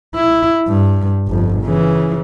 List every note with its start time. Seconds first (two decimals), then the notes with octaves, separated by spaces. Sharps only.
0.15 E4
0.67 G2
1.27 G1 F2
1.62 C#3 E3